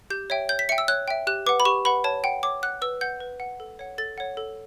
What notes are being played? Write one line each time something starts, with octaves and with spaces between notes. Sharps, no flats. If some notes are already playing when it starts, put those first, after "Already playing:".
G4 G6
C#5 E5 G5
C#5 G6
B6
E5 G5 C#7
E6
C#5 F#6
E5 G5
G4 F#6
B4 F#5 D6
B5
G4 C#6
B4 F#5 B5
C#5 A5
F#5 G5
C#5 D6
F#5 F#6
B4 E6
F#5 G6
B4
F#5
A4
C#5 F#5
A4 A6
C#5 F#5
A4